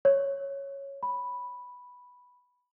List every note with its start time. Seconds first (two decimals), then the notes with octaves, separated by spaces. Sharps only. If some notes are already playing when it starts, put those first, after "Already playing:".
0.05 C#5
1.03 B5